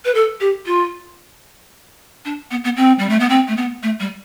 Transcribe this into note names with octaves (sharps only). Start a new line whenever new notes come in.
B4
A4
G4
F4
D4
B3
B3
C4
G3
A3
B3
C4
A3
B3
A3
G3